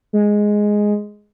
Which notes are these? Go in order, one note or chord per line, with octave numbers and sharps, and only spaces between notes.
G#3